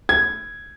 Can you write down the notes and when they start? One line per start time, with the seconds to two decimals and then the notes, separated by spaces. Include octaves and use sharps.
0.09 G#6